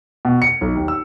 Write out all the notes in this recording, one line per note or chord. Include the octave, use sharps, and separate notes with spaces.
B2
C#7
B1
D#2
E6